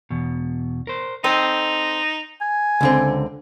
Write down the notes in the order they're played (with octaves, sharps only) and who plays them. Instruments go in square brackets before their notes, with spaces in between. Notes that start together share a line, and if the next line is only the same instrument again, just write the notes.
[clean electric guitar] E2 B2
A#4 C5
[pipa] C4 [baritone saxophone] D#4 [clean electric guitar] A4 D#5
[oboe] G#5
[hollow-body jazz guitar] C#2 D3 C4